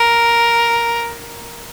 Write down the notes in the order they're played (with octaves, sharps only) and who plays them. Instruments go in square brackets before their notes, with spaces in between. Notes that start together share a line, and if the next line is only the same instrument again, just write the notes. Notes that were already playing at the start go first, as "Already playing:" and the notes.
Already playing: [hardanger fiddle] A#4